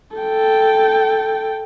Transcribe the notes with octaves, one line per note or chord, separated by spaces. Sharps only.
A4 G5